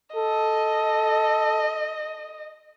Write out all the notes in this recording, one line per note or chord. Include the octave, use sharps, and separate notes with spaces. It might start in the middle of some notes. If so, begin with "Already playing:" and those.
A4 D#5